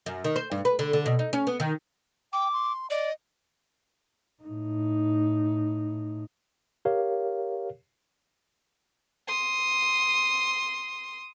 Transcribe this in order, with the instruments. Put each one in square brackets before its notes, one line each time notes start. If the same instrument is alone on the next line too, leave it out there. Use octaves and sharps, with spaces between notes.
[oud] F#2
D#3
C5
G2
B4
D3
D3
B2
D#4
C#4
B3
D#3
[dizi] G5 [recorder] D6
[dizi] C6
[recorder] D5 [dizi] D#5
[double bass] A2 D#4
[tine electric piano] G4 A#4 C#5 F5
[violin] C6 D#6